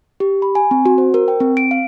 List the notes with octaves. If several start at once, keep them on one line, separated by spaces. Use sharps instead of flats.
G4
B5
G#5
C4
F#4
C5
A#4
G5
C4
D7
F5